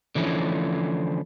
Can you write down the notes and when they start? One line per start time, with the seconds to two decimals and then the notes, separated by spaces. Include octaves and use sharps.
0.15 D3 E3 F3 A3 C#4